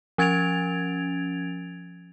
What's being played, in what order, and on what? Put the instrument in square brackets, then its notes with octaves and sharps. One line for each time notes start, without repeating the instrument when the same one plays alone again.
[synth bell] F3 C#4 G#6 A6 D7 F7